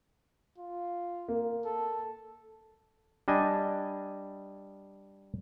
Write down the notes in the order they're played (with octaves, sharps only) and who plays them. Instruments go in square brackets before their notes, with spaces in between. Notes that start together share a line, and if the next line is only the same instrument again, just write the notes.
[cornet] F4
[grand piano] A#3
[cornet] A4
[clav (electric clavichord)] G3 D4 D#5 G#5